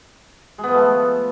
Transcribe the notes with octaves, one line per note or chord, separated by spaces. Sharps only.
G#3
B3
F3
A3
F3